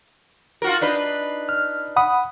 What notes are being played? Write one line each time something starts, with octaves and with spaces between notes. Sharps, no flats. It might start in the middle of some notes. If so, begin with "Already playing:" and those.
F4 F#4 A#4
D4 D#4 B4
F6
F#5 B5 D#6